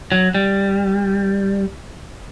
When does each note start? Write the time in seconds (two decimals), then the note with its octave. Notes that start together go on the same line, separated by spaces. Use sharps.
0.12 F#3
0.35 G3